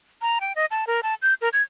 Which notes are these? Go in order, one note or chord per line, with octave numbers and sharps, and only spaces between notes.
A#5
G5
D#5
A5
A#4
A5
G6
A#4
G#6